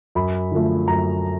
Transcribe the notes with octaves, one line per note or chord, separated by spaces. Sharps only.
F#2 B5
D3 F3 A3
F#2 A#5